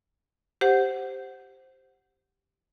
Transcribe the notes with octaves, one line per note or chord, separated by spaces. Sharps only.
G4 C5 F#5